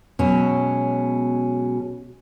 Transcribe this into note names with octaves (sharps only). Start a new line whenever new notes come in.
B2 F#3 G#3 C#4